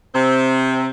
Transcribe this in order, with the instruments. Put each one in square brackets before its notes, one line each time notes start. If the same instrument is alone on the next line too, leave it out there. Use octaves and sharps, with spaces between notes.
[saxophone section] C3 C4